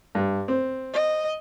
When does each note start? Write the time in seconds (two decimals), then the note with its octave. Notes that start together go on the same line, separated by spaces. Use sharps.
0.15 G2
0.48 C4
0.94 D#5